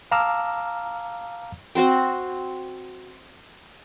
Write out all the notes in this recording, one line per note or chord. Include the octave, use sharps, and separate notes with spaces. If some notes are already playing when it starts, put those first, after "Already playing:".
F5 A5 A#5 D6 E6 F6
C4 F#4 C5 G5